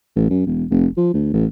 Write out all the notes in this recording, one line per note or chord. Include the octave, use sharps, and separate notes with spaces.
A1
F#2
E1
F1
F3
D2
A1